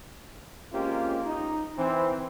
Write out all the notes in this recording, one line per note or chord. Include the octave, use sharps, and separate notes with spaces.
G#3 A#3 C4 C#4 F4 G4
D#4
E3 C4